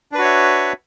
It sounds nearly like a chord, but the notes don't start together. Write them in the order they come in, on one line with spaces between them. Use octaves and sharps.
D4 B4 F#4 C#5 E5